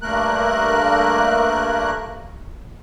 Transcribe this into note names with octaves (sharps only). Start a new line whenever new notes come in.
G2 A3 A#3 A#4 F#6